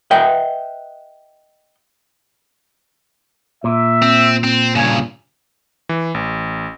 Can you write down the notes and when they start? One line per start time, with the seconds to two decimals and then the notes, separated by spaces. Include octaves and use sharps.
0.11 B4 D#5 E5 G5
3.64 A#2 E5
4.02 C4
4.44 C4
4.75 G2 C#3 G#5
5.89 E3
6.14 A1